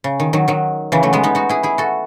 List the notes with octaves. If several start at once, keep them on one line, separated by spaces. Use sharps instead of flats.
C#3
D#3
D#3 F#3
D#3 F#3
C#3 E3
F#3 A3
G#3 B3
B3 D#4
D#4 F#4
E4 G#4
E4 G#4
F#4 A4